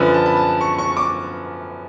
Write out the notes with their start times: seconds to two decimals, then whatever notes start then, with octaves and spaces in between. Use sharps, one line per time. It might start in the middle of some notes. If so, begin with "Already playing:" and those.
Already playing: F#2 D3 F3 B4
0.14 A5
0.26 B5
0.37 A5
0.61 C#6
0.78 C#6
0.97 D6